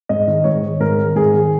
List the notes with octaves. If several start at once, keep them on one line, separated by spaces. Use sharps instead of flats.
G#2 D#5
D#3
G#2 C#5
D#3
G#2 A#4
D#3
G#2 G#4
D#3